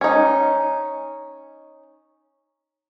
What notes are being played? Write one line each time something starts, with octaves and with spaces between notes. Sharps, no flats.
C#4 D#4